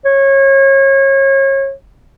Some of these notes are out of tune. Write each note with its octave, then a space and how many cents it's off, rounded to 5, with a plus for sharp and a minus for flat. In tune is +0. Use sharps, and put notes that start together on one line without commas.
C#5 -30